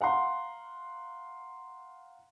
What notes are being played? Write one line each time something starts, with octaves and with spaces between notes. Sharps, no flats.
F5 F#5 A#5 C6